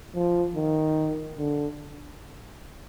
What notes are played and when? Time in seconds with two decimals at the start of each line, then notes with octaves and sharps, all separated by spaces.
0.15 F3
0.56 D#3
1.38 D3